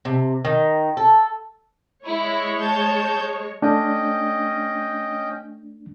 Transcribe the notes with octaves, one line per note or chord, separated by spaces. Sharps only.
C3
D#3
A4
G#3 E4 C#5
A5 G6
A3 C#4 D4 D#5 G5